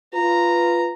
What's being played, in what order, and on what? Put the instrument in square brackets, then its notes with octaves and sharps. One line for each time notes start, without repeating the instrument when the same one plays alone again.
[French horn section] F4 B4 [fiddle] A#5